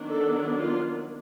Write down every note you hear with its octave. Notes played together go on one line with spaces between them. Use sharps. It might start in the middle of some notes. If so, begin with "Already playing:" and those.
Already playing: D#3 F#3 B3 D4
A4
F4